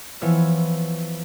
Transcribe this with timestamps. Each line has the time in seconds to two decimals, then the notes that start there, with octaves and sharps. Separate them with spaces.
0.21 E3 F3 B3 C#5 E6